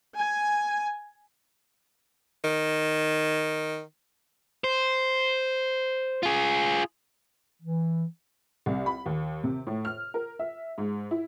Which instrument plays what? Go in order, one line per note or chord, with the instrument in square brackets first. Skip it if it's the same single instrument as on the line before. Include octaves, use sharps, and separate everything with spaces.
[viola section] G#5
[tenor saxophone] D#3
[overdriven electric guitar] C5
F4 G#4
[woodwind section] E3
[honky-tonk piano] C2
B5
D#2
C3
A2
F6
A#4
E5
G#2
E4